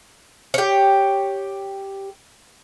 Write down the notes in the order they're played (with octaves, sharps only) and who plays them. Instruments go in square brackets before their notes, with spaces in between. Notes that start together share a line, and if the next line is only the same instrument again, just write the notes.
[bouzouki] G4 C#5